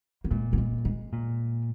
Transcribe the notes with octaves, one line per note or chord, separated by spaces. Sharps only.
A#3
A#2 G#3
A#3
G#3
G#3
A#2